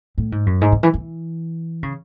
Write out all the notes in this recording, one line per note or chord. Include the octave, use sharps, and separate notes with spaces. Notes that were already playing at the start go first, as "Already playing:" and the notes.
A2
G#2
F#2
G#2
D3
E3
E3
C#3